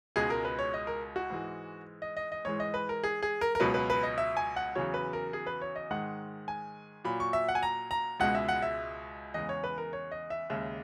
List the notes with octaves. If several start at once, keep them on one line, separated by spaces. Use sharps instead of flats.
C#2 B2 G#3 G#4
A#4
B4
C#5
D#5
A#4
F#4
G#2 E3 G#3
D#5
D#5
D#5
G#2 E3 G#3 C#5
D#5
B4
A#4
G#4
G#4
A#4
A#4
C#2 B2 F#3 B4
B4
B4
D#5
E5
G#5
F#5
E2 C#3 F#3 C#5
B4
A#4
G#4
B4
C#5
D#5
G#2 D#3 G#3 F#5
G#5
A#2 F#3 B5
C#6
E5
F#5
G#5
A#5
A#5
C#2 B2 G#3 F#5
E5
F#5
E5
E2 C#3 G#3 D#5
C#5
B4
A#4
C#5
D#5
E5
D#2 C#3 G#3 E5